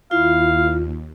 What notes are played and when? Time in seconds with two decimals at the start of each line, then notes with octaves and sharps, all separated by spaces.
0.11 D#2 E4 F4 F5